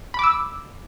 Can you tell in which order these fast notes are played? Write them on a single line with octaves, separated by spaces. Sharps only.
B5 D6 E6